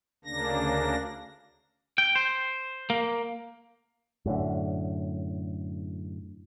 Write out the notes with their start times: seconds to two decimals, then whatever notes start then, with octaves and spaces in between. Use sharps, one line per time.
0.25 D2 C#3 A#3 D4 A#6
1.98 G5
2.16 C5
2.90 A#3
4.26 F#2 A2 D3